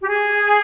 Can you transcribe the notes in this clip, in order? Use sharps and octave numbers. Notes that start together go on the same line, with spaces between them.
G4
G#4